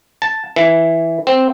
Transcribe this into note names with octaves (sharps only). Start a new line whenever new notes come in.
A5
E3
C4